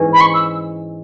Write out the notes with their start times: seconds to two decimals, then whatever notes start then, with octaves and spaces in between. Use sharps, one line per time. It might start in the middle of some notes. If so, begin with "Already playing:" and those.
Already playing: G#2 E3 G#3 C#4 E4
0.13 B5
0.21 C#6
0.34 E6